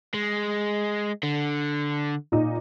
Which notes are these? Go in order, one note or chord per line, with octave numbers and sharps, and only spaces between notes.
G#3
D3
A#2 D#4